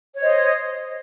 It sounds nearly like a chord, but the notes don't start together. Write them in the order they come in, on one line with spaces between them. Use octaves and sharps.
C#5 C5 D#5